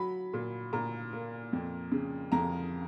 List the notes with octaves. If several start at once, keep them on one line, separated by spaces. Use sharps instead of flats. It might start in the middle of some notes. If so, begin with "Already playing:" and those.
Already playing: F#3 B5
A#2
A#2 A#5
A#3
F2
C#3
F2 A#5